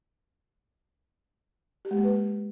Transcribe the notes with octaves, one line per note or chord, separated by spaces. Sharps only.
G4
G#3
A#3
B4